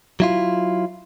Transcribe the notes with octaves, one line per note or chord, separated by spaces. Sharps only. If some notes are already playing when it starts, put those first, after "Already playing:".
F#3 E4 F4